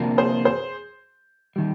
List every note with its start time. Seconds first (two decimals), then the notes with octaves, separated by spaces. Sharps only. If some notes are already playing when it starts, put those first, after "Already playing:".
Already playing: C3 F3 A#3 D4
0.18 G#4 C5
0.45 G#4 C5
1.56 D#3 G3